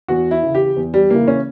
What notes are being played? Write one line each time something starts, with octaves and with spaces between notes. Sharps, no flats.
E2 F#4
E4
C#3 E3
G4
E2
G3
C#3 E3 A#3
C#4